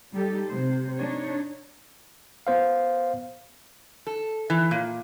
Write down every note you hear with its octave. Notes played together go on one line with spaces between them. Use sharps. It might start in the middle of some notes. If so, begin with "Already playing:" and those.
G3 D#4 G4 A4
C3 C5
D4 D#4 C#5
B3 C5 F5
A4
E3
A#2